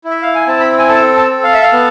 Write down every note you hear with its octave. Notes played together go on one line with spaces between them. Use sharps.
E4
E5
F5
G#5
C4 A5
B5
G#5
A4 A5
A5
A4
F5
E5
F5
B3